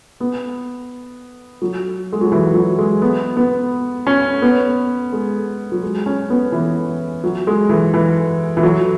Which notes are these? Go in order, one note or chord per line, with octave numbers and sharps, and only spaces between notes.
B3
F#3
G#3
F#3
E3
F#3
G#3
B3
B3
C#4
B3
G#3
F#3
G#3
C#4
B3
E3
F#3
G#3
E3
E3
E3
F#3